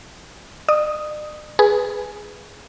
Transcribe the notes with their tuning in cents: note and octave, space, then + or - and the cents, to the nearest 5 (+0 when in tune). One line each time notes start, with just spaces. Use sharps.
D5 +45 D#6 +0
G#4 +0 B4 +0